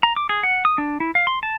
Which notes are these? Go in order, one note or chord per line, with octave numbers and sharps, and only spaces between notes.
A#5
D6
G#4
F#5
D#6
D4
E4
F5
C6
A5